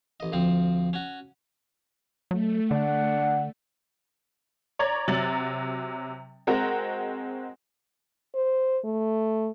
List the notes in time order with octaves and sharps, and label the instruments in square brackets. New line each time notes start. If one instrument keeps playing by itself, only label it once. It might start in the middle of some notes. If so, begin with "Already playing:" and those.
[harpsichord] A1 D#5
D2 F3 C4
C#4 F#4
[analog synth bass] F#3 [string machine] A3
[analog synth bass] D3 [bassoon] D4 [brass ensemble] F#5
[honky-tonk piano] C#5 D5 A#5 G#6
C3 F#3 A6 F#7
G#3 C4 F#4 A#4 F#5
[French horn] C5
A3